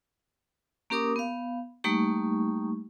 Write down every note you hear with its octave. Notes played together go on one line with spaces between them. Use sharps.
A#3 C#4 G4 A#4 D6 D#6
B3 F5
G3 A3 A#3 D#4 G4 C#6